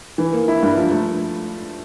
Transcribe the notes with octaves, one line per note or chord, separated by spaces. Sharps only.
E3
A#3
E4
G2
F3
A3